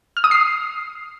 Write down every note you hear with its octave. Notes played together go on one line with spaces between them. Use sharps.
F6
D#6
C7